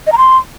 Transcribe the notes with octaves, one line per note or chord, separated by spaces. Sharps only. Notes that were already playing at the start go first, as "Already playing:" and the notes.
D#5
A#5
C6